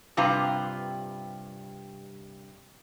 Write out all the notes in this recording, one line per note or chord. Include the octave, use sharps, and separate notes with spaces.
G2 C3 F4 B4 A#5